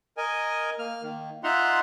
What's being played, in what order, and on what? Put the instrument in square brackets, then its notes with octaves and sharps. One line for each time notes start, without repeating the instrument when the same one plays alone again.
[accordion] A#4 D#5 G#5
A#3 F6
D#3 A#3
D#4 F4 E5 F#5 A#5 C6